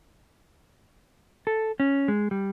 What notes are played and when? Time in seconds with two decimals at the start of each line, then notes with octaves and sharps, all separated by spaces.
1.47 A4
1.80 C#4
2.08 G#3
2.31 G3